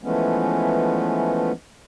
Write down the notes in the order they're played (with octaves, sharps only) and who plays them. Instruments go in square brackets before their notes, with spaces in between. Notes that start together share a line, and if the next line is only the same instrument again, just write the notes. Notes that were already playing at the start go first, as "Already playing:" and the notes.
[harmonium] E3 F3 G#3 A3 B3 C#4